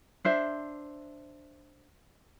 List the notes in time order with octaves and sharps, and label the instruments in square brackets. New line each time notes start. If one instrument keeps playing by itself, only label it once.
[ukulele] D4 C5 E5